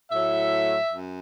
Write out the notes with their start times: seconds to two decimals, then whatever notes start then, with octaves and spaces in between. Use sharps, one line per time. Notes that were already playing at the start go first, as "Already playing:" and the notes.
0.11 A2 F#3 E5
0.91 F#2